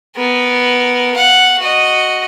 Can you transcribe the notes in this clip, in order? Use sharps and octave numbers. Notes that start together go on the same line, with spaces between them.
B3 A#4
F5 F#5
F#4 D#5